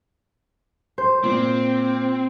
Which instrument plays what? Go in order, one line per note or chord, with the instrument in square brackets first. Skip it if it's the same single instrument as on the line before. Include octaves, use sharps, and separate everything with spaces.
[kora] C5
[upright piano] A#2 [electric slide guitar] C4